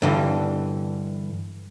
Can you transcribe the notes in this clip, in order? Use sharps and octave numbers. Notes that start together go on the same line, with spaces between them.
G2 D3 E3